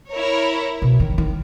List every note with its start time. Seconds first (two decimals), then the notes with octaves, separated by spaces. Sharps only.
0.11 E4 A#4 C#5
0.82 B2
1.00 D#3
1.18 D#3